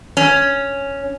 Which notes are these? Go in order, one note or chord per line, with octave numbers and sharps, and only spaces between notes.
C#4